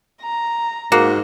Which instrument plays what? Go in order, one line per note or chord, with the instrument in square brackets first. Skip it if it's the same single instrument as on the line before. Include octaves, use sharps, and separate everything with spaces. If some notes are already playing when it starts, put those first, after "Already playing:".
[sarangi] A#5
[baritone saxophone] G#2 [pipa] A#3 [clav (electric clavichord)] F#4